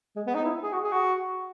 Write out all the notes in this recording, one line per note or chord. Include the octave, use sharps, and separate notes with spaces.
G#3
B3
D#4
E4
G#4
F#4
G#4
F#4